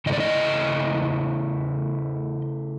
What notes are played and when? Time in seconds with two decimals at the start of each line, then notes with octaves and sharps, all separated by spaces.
0.06 C#3 E3 A3 D#5
0.13 D5
0.20 D#5